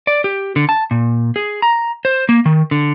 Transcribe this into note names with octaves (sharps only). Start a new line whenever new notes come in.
D5
G4
D3
A5
A#2
G#4
A#5
C5
A#3
D#3
D3